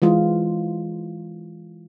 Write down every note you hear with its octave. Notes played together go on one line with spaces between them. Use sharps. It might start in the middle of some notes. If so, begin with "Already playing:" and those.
E3 G#3 F4